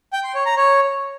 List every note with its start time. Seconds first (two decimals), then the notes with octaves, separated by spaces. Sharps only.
0.13 G5
0.24 C6
0.35 C#5
0.46 A#5
0.57 C#5